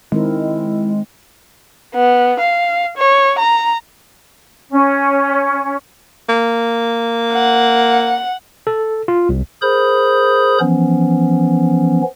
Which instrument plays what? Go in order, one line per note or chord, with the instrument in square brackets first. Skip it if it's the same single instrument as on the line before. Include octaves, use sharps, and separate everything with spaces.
[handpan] D#3 C4 A#4 [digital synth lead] G#3 [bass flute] E4
[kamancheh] B3
F5
C#5
A#5
[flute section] C#4
[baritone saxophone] A#3
[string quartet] F#5
[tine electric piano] A4
F4
C2
[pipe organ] G#4 A#4 C5 B5 D#6 G6
E3 F3 B3 C#4